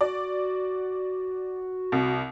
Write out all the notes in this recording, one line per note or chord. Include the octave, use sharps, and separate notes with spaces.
F#4 D5
C2